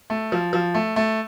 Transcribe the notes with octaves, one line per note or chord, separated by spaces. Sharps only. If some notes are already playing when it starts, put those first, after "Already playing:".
A3
F3
F3
A3
A3